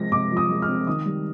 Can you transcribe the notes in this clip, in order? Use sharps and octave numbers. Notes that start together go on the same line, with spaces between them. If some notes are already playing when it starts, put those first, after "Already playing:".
Already playing: C3 F3 G#3 C4 A#6
C3 D6
F3
D#6
G#3
F6
C4
D#3 D#6
G3